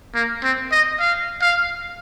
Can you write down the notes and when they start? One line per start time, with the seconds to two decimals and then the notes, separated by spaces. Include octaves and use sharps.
0.15 A#3
0.43 C4
0.72 D#5
1.00 F5
1.42 F5